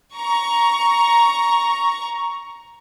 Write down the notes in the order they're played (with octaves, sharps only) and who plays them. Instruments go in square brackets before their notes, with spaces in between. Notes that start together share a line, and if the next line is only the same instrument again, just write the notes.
[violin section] A#5 C#6